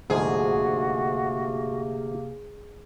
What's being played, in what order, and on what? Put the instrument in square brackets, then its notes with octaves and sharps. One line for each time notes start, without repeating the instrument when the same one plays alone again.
[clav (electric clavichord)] D2 G#2 F3 [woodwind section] C3 A#3 [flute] F#4 [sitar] G#4